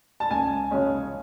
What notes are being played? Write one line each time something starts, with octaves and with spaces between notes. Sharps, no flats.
A5
C#2 G#5
C#3 G#3 C#4